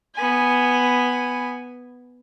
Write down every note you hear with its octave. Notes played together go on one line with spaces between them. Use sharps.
B3 G#5